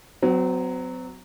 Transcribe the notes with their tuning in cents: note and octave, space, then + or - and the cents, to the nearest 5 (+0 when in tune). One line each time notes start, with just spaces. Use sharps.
F#3 +0 C4 -40